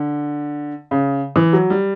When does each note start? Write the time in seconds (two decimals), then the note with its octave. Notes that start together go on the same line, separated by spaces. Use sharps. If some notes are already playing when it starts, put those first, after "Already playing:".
Already playing: D3
0.91 C#3
1.36 E3
1.53 F#3
1.70 G3